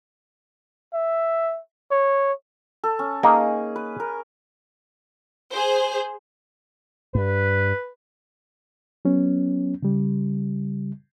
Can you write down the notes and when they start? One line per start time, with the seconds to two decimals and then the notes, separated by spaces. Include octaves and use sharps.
0.94 E5
1.91 C#5
2.84 A4
2.99 C#4
3.23 A#3 D#4 G#4
3.76 B4
4.00 A#4
5.50 G#4 C5
7.15 G2 B4
9.05 F#3 B3 C#4
9.83 C#3 G3